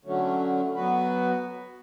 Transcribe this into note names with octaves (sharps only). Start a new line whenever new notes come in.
D3 F#3 A3 C#4
F#3 B3 F#4 B4